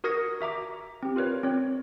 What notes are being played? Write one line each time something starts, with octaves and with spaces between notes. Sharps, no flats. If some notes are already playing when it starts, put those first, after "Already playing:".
F#4 A#4 D#6 G#6 A#6 C#7
F#4 E5 A#5 D6
C4 G4
F4 A#4 B4 C#5
C4 C#5